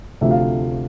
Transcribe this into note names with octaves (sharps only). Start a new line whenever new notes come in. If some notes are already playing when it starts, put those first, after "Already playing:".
D2 C3 F3 A3 E5
F5